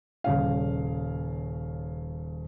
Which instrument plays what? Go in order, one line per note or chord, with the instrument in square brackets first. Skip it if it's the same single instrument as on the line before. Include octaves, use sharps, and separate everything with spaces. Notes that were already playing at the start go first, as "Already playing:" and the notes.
[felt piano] D#1 C#3 F5